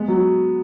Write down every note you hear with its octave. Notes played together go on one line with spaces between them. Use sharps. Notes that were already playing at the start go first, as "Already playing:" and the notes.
Already playing: G#3 B3
F#3